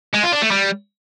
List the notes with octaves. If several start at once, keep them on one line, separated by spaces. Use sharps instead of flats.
G#3
F4
D4
A3
G3